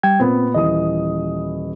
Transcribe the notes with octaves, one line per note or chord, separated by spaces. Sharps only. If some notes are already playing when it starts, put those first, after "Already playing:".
G3 G5 G#6
A#2 B3 C4
D#1 E3 D#5 D#6